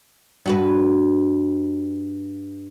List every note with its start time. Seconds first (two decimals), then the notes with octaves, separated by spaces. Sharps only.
0.46 G2 F#4 B4